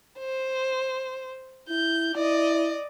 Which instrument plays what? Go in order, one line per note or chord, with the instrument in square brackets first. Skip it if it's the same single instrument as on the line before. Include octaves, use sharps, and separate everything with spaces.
[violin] C5
[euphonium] E4 [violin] G6
[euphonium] E4 [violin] D5 D#5